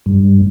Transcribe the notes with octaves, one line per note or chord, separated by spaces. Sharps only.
G2